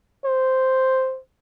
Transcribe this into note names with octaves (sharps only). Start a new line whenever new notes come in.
C5